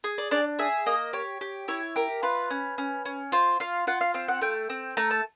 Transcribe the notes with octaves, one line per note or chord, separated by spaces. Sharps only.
G#4
D5
D4 D5
G#4 E5
A#3 D#5
G4 C#5
G4
E4 C#5
G4 A#4
F4 B4
C#4
C#4
C#4
F4 C5
F4 F5
F4 F#5
F5
C4 F5
F#5
A3 G5
C4
A3 A#5
A5